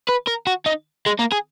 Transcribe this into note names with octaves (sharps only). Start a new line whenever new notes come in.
B4
A#4
F#4
D#4
G#3
A#3
G#4